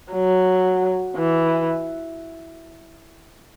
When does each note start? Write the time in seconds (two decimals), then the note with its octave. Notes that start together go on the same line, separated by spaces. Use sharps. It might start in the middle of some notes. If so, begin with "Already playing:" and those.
0.13 F#3
1.16 E3